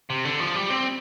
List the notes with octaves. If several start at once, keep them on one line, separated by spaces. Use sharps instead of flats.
C3
D3
F3
G3
C4